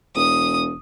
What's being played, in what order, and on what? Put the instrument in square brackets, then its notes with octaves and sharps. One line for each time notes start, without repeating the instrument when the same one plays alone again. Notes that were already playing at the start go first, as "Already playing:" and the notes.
[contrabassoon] E1 [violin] D#6